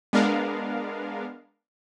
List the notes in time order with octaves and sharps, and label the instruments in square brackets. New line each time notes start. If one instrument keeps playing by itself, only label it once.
[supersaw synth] G#3 B3 D4 A#4 F5